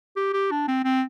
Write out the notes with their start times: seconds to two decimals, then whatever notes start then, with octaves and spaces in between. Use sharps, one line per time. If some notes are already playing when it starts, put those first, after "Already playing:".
0.17 G4
0.33 G4
0.51 D4
0.68 C4
0.85 C4